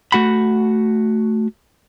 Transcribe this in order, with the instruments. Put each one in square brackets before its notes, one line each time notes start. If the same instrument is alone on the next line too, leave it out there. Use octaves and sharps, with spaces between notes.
[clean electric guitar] A3 F#4 F#5 B5